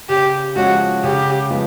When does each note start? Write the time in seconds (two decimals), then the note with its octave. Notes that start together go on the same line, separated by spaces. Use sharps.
0.09 C#3 G4
0.56 F3 G#3 C#4 F#4
1.04 C#3 G4
1.50 F3 G#3 B3